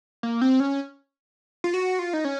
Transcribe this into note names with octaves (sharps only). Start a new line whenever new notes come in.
A#3
C4
C#4
F4
F#4
F4
D#4
C#4